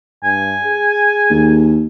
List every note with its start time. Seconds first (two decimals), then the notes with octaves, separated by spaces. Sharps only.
0.24 G2 G#5
0.64 G#4
1.30 D#2